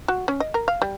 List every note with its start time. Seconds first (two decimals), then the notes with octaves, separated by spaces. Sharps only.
0.08 F#4
0.28 C#4
0.40 D#5
0.54 A#4
0.68 F5
0.82 G3